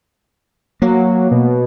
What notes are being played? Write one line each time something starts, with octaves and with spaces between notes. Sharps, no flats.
F#3 A#3
B2